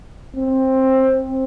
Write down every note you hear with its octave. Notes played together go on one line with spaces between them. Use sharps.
C4